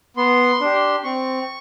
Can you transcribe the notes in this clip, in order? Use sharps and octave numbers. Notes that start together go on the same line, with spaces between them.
B3 C6
D4 G4
C4 C#6